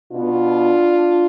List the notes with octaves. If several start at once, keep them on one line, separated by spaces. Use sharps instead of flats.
B2 B3 D4 F4